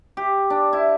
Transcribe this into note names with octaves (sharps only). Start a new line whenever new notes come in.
G4
D4
E4